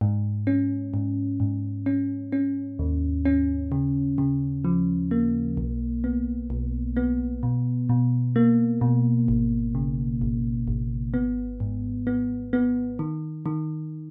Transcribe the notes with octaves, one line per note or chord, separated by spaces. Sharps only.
G#2
C#4
G#2
G#2
C#4
C#4
D#2
C#4
C#3
C#3
F3
A#3
B1
B3
B1
B3
B2
B2
A#3
B2
G#1
C#3
G#1
G#1
B3
G#2
B3
B3
D#3
D#3